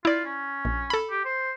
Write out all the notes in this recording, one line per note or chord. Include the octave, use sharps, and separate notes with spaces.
E4 F4 D5
C#4
A#1
A4 B5
G4
C5